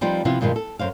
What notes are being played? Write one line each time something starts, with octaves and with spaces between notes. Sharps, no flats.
F3 G3 C4 D#4 F4 B4
C3 F3 B3 E4 F4
G2 B2 D#3 F3 G#3
A4
F#2 C5 F5